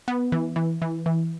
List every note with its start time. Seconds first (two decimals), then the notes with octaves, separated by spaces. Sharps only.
0.08 B3
0.32 E3
0.56 E3
0.82 E3
1.06 E3